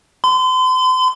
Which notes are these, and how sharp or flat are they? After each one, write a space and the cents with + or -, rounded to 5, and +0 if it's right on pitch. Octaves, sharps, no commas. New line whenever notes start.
C6 -40